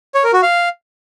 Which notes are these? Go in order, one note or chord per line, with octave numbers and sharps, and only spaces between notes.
C#5
A#4
F#4
F5